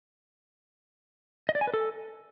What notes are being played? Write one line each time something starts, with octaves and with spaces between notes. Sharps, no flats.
D#5
D5
G#5
B4
A4